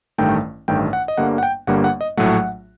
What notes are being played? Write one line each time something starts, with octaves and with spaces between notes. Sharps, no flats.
A1 G2 D#3 A3 G5
A1 G2 D#3 A3 G5
F#5
D#5
G1 G2 D3 G3 A#3 F#5
F#5
G5
G1 G2 D3 G3 A#3 F#5
F#5
D#5
A#1 A2 F#3 A3 F#5